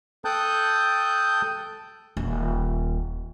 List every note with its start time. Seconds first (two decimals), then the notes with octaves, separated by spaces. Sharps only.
0.25 A4 G5 A5 D#6 F#6 G6
2.17 D#1